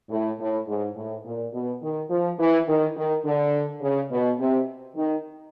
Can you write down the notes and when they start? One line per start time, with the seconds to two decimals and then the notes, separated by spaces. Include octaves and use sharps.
0.09 A2
0.39 A2
0.67 G#2
0.95 A2
1.24 A#2
1.53 B2
1.81 D#3
2.10 F3
2.39 E3
2.67 D#3
2.96 D#3
3.24 D3
3.81 C#3
4.10 B2
4.38 C3
4.95 D#3